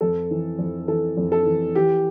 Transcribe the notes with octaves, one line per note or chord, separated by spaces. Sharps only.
F2 A4
E3
F2
E3 A4
F2
A4
E3
E3 G4